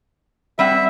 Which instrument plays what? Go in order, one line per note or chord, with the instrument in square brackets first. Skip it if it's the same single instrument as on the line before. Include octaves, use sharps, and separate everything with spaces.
[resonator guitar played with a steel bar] G3 C4 F#5 [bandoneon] E5